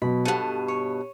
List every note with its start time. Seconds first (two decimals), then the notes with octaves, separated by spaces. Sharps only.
0.02 B2 F#3 B5
0.25 G2 B2 A4 F#5 D#7
0.68 C#5